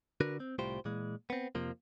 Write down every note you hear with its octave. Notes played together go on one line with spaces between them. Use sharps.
D3 D4 F#4 A#4 B4
C4
C2 A2 F4 G4 C5
A#2 E3 G#3
B3 C4
F2 C3 F3 A#3